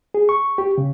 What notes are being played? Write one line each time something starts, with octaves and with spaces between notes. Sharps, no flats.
G#4
C#6
G4
C#3